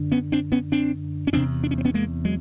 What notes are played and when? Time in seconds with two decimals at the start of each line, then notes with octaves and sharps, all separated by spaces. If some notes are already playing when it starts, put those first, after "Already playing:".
Already playing: F#2 D3
0.12 B3 C#4
0.32 C4 D4
0.52 B3 C#4
0.72 C4 D4
1.27 C#4
1.33 E2 C3 C4 D4
1.64 D4
1.71 C#4
1.78 C4
1.85 B3 C#4
1.94 G#3 A#3
2.25 F#3 G#3